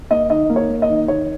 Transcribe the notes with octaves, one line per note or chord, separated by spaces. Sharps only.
A#3 D#5
D#3 D#5
A#3
C#5
A#3
D#5
D#3
D#3 C#5